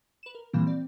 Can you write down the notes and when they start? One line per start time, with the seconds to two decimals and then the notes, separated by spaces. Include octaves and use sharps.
0.23 B4 E7
0.35 A#4
0.53 A#2 E3 F3 G3 A#3 C4
0.67 C4 D5